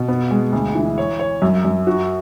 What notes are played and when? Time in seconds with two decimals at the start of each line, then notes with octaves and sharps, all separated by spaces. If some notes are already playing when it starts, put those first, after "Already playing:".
Already playing: B2
0.08 B3
0.31 G#3
0.53 D2
0.75 E3
0.98 C#5
1.19 C#5
1.42 F#2
1.65 F#2
1.87 F#4